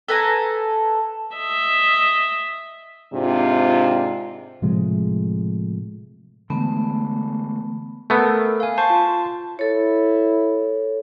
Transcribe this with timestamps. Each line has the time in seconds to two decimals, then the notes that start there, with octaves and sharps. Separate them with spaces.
0.08 A4 B4 G#5 A#5
1.36 D#5 E5
3.13 G#2 C3 D4 F4
4.62 A2 C3 F3 G#3
6.50 D3 E3 G#3 A3 B3
8.10 A3 B3 A4 A#4
8.60 F5 G#5
8.78 C5 A5 C#6
8.90 F4
9.59 E4 A4 C#5